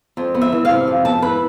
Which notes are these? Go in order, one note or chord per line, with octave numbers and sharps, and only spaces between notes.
F2
B3
E5
E3
F5
C3
F2
B3 A5
E3 B4